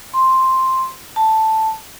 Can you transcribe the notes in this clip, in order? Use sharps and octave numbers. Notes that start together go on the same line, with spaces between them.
C6
A5